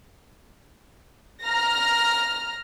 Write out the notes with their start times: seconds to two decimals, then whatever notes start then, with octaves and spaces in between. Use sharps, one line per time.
1.43 A#5 F6 A#6